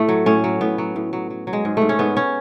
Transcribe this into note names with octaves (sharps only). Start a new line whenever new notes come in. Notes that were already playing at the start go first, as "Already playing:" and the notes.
Already playing: A2 A3
F#3
A2 C#4
F#3
A2 B3
F#3
A2
F#3
F#3
F#3
G#3
G#2
G#2 A3
C#4
G#2 B3
C#4